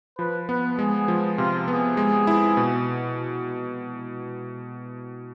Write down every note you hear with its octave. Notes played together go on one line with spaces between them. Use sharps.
F3 B4
B3 B4
G#3 G#4
F3
C3 F4
B3 G#4
G#3
E4
B2